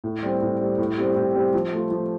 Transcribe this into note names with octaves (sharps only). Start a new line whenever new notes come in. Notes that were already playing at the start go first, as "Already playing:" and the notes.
A2
G3 C4
A2
G3 C4
A2
G3 C4 G4
A2
G3 C4 G4
F3
A3 F4
F3